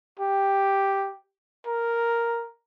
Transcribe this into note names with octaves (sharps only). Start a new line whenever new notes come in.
G4
A#4